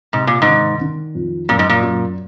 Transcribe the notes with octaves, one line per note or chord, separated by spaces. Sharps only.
G#2 C3
A#2
G#2
D#3
D#3
F2
F#2 A#2
G#2
A#2
F#2